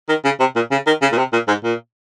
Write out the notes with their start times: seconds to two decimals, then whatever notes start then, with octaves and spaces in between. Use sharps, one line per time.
0.09 D#3
0.24 C#3
0.40 C3
0.56 A#2
0.71 C#3
0.87 D#3
1.02 C#3
1.12 A#2
1.18 C3
1.33 A#2
1.48 G#2
1.64 A#2